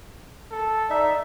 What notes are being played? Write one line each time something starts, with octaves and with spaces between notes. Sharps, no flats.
A4
D#4 D5 E5